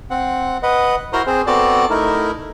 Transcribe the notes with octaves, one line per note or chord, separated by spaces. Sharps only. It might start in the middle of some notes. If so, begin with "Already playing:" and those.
C4 F#5
B4 D#5 F#5
E4 F#4 A#4 C5 A#5 C6
C4 G#4 C5
B3 C4 F#4 A4 D5 A5
A3 D#4 E4 A#4